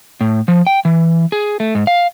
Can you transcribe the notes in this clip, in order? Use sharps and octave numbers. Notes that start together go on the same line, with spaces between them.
A2
F3
G5
E3
G#4
A3
G#2
F5